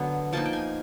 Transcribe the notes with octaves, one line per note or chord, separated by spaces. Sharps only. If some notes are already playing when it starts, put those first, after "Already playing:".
Already playing: D3 F#3 B3
F3 A#3 D#4 A5
G5
G#5